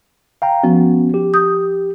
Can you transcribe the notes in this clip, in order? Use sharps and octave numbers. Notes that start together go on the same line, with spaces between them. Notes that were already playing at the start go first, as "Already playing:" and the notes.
F5 G5 A#5
F3 B3 C#4 F#4
G4
D#6 G6